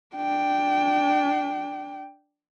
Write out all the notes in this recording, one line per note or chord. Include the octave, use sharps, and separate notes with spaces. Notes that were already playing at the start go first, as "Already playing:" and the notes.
D4 G5